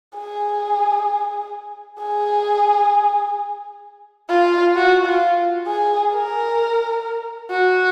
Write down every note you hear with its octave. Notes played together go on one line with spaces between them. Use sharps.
G#4
G#4
F4
F#4
F4
G#4
A#4
F#4